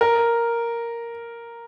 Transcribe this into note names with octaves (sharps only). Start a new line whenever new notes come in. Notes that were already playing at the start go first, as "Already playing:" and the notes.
A#4